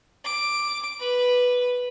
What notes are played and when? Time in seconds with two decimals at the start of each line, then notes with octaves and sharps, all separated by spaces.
0.25 D6
1.00 B4